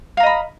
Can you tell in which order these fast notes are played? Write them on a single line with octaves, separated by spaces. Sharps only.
F5 A#5 D#5 B5